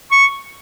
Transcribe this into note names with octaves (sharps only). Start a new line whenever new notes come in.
C#6